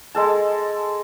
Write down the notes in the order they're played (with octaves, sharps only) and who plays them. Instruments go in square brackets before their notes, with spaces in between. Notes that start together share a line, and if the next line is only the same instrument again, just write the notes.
[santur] G#3 A4 A5